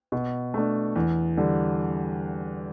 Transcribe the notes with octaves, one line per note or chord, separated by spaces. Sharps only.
B2
A3 D4
E2
D3 G3